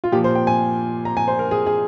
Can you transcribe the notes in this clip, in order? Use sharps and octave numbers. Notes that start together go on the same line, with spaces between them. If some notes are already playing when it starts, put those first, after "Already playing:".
F4
A#2 F3 A#3 G4
C5
G5
G#5
A#5
G#5
C5
A#4
G#4
G#4